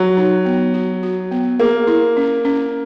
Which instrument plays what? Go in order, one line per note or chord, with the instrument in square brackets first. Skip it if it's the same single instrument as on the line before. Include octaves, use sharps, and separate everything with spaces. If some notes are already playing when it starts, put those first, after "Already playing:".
Already playing: [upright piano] F#3
[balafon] D#4
B3
F#4
F#4
B3
[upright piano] A#3 [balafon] G#4
[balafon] E4
C#4
C#4